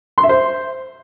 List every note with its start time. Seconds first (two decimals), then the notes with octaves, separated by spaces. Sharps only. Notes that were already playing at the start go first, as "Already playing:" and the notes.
0.18 C6
0.23 E5
0.29 C5